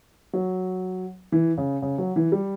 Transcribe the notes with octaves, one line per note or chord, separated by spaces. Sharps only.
F#3
E3
C#3
C#3
F#3
E3
G3